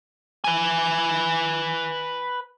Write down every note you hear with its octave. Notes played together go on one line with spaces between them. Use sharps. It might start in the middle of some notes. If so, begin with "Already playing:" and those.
B4 G#5